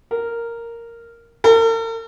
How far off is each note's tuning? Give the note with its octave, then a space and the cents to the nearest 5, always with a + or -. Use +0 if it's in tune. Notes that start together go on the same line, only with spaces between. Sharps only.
A#4 -5
A#4 -45